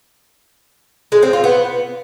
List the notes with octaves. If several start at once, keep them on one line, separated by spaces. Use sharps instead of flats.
G#3
C4
F4
B3